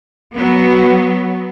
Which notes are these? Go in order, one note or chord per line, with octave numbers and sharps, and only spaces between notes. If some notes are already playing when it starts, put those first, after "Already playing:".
F#3 B3